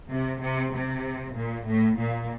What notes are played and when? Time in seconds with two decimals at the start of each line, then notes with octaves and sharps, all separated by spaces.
0.10 C3
0.41 C3
0.73 C3
1.36 A#2
1.67 A2
1.98 A#2